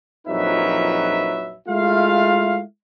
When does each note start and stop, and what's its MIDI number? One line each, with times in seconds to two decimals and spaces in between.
0.28 1.55 34
0.28 1.55 41
0.28 1.55 54
0.28 1.55 63
0.28 1.55 71
0.28 1.55 76
1.68 2.60 56
1.68 2.60 57
1.68 2.60 64
1.68 2.60 65
1.68 2.60 77